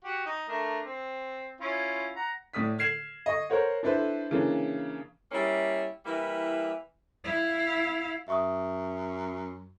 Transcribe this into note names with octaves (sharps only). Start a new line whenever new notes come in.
F#4 G4
D#4
A3 D4 A#4
C4
C#4 E4 F4
F#5 A#5
A2 D5 D#6 B6
F6 G#6 C7 E7 F#7
D#5 C#6
A#4 C5 C#5 F#5
D4 E4 A4 B4 C5
C#3 E3 A#3 D4
G3 A#3 C#4 E4
E3 G3 A#3 E4
E4 F5
F#2 E5 C#6 D#6